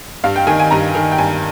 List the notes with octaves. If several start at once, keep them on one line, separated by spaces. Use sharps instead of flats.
G2 F5
G5
D#3 G#5
G#5
G2 A#5
D#3
G5
G2 G#5